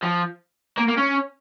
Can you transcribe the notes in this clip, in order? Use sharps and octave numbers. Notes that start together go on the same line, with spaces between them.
F3
A#3
A#3
C#4